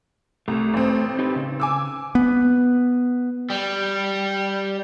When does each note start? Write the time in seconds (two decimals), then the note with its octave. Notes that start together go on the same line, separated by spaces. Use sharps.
0.48 C2 A3
0.74 A1 C4
1.19 D#4 G4 B4
1.36 C#3
1.60 G#5 D6 E6
2.15 B3
3.50 G3